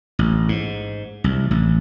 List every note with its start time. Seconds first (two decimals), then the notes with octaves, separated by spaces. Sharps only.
0.19 A1
0.49 G#2
1.24 C2
1.51 A1